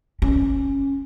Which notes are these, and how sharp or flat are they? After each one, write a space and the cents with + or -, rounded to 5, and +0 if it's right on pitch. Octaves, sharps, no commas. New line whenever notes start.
C#4 -10